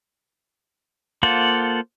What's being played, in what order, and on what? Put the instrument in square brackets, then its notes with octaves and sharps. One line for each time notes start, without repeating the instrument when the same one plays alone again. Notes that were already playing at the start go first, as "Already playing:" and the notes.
[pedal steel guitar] A#3 F4 A4 C5 F#5